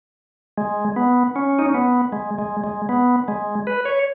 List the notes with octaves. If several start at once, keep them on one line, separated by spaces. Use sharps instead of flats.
G#3
B3
C#4
D#4
C#4
B3
G#3
G#3
G#3
B3
G#3
B4
C#5